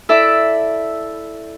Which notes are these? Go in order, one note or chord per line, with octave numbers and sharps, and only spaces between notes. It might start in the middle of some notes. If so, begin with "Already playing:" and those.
E4 A4 D5 E5